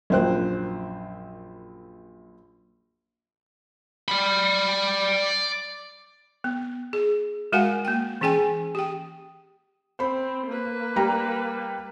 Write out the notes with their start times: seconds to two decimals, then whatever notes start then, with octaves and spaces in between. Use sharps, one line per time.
0.10 A#1 F#2 C5 G5 F#6
4.08 D5 B5
6.44 B3
6.93 G#4
7.52 G#3 F#4 A#4 F5 F#5 G#5
7.85 A#3 G5
8.21 E3 C#4 G#4 G5 G#5
8.75 G4 G5
9.99 C4 C5 B5
10.47 A#3 B4
10.96 G3 A#5